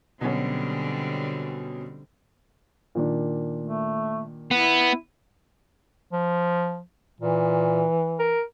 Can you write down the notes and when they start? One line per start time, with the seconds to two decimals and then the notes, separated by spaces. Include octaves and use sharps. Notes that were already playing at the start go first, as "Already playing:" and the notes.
0.21 B2 D3 F#3 G3 C4 C#4
2.95 A#2 D#3 D4
3.61 A3
4.51 B3 E4
6.13 F3
7.21 A#2 E3
8.19 A#4